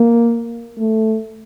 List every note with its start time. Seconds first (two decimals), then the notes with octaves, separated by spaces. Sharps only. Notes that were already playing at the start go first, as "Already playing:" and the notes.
Already playing: A#3
0.79 A3